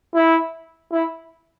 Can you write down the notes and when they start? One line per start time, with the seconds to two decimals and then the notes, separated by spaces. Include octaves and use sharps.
0.15 E4
0.92 E4